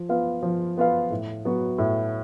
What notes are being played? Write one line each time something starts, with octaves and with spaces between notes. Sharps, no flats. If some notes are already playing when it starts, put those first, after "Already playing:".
Already playing: F3
B3 F4 B4 F5
F3
B3 F4 B4 F5
A2
F#3 B3 F#4
A2